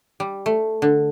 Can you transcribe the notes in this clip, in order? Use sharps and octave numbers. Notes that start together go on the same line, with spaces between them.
G3
A3
D3